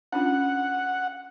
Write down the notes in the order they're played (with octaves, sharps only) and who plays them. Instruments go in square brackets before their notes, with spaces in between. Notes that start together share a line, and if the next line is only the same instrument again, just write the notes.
[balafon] C#4 D4 F4 [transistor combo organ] F#5